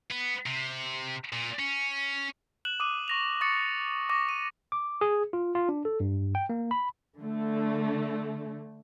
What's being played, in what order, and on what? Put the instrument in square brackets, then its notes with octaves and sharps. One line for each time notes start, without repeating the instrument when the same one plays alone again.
[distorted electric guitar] B3
C3
A#2
C#4
[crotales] F#6 E7 F#7
D6 D#6 D#7
C#6 A#6 F7
C#6 D#6 A6 C#7
C#6 D6 A#6
D#7
[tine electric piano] D6
G#4
F4
F4
D4
A4
G2
G5
A#3
B5
[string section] D3 A3